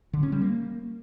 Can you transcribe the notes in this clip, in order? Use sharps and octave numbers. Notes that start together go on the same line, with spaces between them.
D3
C#4
G3
A#3